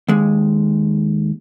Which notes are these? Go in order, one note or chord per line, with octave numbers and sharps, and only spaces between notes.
D#2 G#3